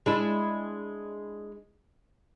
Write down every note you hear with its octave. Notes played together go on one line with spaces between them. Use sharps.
G#3 D4 E4